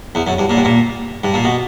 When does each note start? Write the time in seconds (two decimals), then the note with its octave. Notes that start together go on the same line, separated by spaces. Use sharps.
0.15 E2
0.27 F#2
0.38 G2
0.50 A#2
0.57 G2
0.65 A#2
1.24 G2
1.34 A#2
1.44 B2